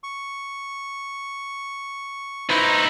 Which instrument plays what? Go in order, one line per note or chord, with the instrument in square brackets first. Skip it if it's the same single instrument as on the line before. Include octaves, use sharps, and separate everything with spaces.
[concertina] C#6
[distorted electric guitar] D#4 E4 [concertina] B4 C5 C#6